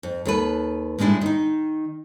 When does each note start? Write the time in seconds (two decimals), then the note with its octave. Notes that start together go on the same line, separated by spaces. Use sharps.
0.03 F2
0.25 D#2 A4 B4
0.99 A2 G3 G#3 D4 E4
1.21 D#3 D#4